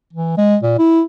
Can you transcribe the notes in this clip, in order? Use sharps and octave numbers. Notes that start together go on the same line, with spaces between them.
E3
G#3
A#2
E4